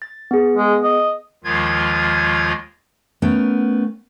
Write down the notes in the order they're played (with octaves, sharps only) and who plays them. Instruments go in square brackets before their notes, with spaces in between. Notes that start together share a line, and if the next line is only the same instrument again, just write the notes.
[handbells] A6
B3 G#4
[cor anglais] G#3
D#5
[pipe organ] D#2 D#3 F3 G#3 F4 G#6
[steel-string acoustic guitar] A3 B3 C#4 A#4 G5